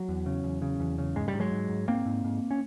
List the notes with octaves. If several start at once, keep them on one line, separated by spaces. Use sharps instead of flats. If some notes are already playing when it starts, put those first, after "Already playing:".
Already playing: F#3
E2
C#3
E2
C#3
E2
C#3
G#2 G#3
G3
G#2
F#3 G#3
G#2
G#2
G#2 A#3 C4
G#2
G#2
C#4